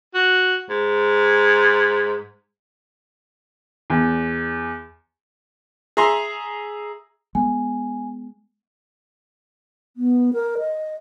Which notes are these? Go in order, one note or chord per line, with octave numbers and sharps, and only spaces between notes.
F#4
G#2
E2
G#4 E5 A#5 C6
G#3 B3 G#5
B3
A#4
D#5